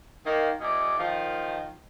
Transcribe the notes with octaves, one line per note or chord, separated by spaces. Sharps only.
D#3 A#3
E2 B2 G#4 D5
D#3 F3